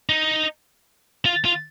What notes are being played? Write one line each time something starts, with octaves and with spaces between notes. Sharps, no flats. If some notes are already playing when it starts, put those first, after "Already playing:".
D#4
F4
F4